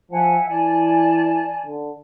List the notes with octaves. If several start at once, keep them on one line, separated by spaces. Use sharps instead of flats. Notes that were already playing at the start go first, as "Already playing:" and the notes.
F3 E5 F#5 G#5
E3 D5 G#5 A5
D3